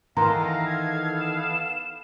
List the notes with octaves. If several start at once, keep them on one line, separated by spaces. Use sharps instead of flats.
D#3 E3 B3 A4 F5 A#5 C6 A#6
G#6
E7